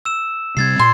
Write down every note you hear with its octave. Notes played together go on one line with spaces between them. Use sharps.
E6 E7
C3 G3 C4 G#6 A6 C7
A#2 C6